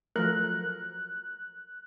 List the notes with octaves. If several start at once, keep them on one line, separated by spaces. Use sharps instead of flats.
F3 F#3 A3 A#4 F#6